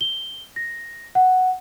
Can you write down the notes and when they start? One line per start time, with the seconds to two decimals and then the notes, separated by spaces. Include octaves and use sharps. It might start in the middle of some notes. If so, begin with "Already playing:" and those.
0.01 G7
0.56 A#6
1.15 F#5